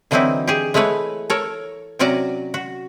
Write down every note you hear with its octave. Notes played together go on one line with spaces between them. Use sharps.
D3 E3 F#3 C4 D#4 E4
G4 G#4
G#3 A3 E4 B4 C#5
A4 A#4 C#5
C3 F#3 C#4 F#4 D5 A#5
F#4